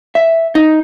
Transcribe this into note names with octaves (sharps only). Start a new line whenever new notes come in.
E5
D#4